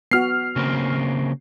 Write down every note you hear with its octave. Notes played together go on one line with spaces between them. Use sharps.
B3 F#4 F6 C7
C#3 A#3 C4